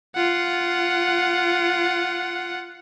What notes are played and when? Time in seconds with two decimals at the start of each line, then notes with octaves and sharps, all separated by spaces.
0.15 F4 F#5